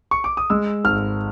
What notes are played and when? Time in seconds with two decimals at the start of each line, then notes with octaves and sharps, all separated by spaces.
0.11 C#6
0.24 D6
0.37 D#6
0.50 G#3 E6
0.84 G#1 F6